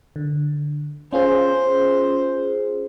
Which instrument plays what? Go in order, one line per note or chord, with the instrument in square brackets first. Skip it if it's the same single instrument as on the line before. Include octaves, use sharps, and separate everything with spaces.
[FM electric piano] D3
[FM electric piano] C#4 F4 G#4 [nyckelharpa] C5